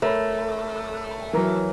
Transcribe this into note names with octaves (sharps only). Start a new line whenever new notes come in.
A3 A#4 C#5 B5
E3 F#3 A#4 A#5